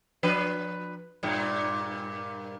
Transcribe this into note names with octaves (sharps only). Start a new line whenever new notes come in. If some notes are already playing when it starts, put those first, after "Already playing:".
F3 D4 B4
G2 A#2